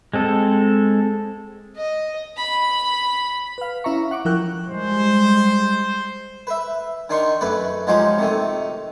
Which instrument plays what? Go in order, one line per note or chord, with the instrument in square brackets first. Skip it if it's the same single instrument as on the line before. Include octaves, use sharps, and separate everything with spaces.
[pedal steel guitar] G#3 C4 A4
[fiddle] D#5
B5
[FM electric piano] B4 F5
C#4 E4 E5 A#5 C#6
F#5 C#6 D6
F3 E4 A#4 G5 F#6
[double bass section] G3 G#3 [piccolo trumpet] C5
[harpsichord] B4 E5
D#3 D4 D#4 C6 C#6
F#2 A3 B4 D5
F3 F#3 G#3 D#4 F4 G4
C3 D#3 A3